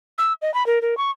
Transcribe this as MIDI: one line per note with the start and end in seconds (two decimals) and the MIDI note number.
0.18 0.33 88
0.42 0.53 75
0.54 0.66 83
0.67 0.79 70
0.82 0.97 70
0.97 1.11 85